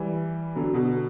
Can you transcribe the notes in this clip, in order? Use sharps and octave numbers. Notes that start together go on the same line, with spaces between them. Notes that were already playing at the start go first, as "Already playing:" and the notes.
Already playing: E3 G3
D3 F#3
B2 D3